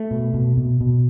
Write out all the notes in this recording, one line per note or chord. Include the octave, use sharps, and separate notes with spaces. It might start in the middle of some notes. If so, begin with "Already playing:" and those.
Already playing: A3
B2
B2
B2
B2